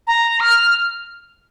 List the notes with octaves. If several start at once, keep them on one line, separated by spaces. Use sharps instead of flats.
A#5
F6